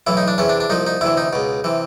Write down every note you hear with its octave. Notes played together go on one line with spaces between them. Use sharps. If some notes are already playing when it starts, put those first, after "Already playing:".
B1 A2 E3 E4
D#4
D4
E2 C3 E3 C#4
D4
D4
C2 A#2 F3 D#4
D#4
D2 C3 E3 E4
D#4
C#2 B2
C3 E3